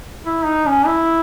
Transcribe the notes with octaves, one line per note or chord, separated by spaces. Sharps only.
E4
D#4
C#4
E4